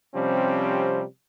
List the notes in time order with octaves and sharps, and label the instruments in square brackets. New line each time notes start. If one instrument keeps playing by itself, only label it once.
[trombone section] C3 F3 G3 C4 C#4